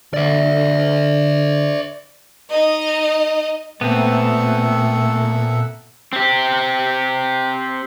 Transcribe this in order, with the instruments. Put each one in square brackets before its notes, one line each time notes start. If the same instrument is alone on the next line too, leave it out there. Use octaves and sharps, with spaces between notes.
[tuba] D3 [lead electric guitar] D5 E5
[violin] D#4 D#5
[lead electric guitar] A#2 [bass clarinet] A3 [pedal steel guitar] B3 C4 [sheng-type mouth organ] A4 E5 F#5
[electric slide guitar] C4 G4